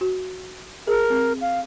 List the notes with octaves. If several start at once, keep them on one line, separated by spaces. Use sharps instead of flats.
F#4
G#4 A#4
C4
F5